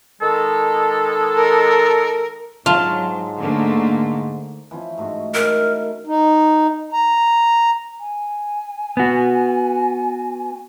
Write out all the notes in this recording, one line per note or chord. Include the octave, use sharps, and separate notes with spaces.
D#3 G#3 A4
A#4
G#2 F#3 F4 A5
D3 A3 A#3
E3 F3 C#4
G#2 A3 F#4
D#4 E4 A4 A#4
D#4
A#5
G#5
B3 F#4